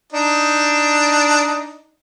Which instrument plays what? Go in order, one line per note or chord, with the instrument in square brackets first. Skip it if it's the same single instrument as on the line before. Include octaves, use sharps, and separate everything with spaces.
[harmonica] D4 D#4